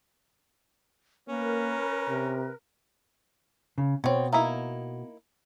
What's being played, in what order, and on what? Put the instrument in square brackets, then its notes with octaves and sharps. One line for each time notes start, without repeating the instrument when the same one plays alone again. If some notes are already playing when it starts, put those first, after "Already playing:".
[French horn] A#3 [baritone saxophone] C#4 [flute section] A#4 B4
[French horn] C3
[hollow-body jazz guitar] C#3
[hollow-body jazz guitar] B2 [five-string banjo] C4 C#5
[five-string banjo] A#3 D#4 E4